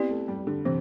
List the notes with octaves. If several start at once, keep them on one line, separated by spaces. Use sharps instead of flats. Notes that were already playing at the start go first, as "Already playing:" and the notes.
Already playing: B3 C4 E4 G4 D5
A3
G3
D3
C3 E3